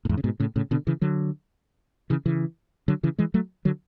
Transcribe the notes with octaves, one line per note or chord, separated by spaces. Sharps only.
A2
E2 G#2
C#3
G#2 B2
A2 C#3
A2 C#3
B2 D3
C#3 E3
D3 F#3
C#3 E3
C#3 E3
D3 F#3
C#3 E3
E3 G#3
F#3 A3
D3 F#3